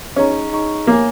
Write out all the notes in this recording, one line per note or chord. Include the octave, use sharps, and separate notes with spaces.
C#4 D#4 G#4 D#5 A#5 C#6
D#4 G#4 D#5 A#5 C#6
A#3 A#4 C#5 G#5